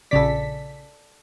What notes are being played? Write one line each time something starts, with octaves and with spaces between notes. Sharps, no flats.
A#1 C#3 A4 D5 B6